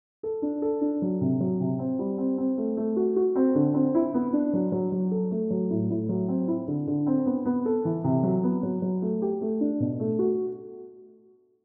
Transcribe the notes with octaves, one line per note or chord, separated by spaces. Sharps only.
A4
D4
A4
D4
F#3
C3
F#3
C3
C4
G3
C4
C4
A3
A3
F#4
F#4
C4
D3
C4
E4
B3
D4
F#3
F#3
F#3
A4
A3
F#3
A2
A2
F#3
C4
E4
D3
D3
C4
B3
B3
A4
E3
C3
F#3
B3
F#3
F#3
A3
G4
A3
D4
B2
A3
F#4